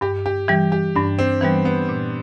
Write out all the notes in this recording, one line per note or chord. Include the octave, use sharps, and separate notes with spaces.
G2 G4
G4
E3 G3 G4
G4
G2 D4
C4
E3 G3 B3
B3
A#2